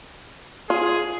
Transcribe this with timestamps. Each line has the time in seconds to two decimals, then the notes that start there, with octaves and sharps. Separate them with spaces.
0.70 F4 G#4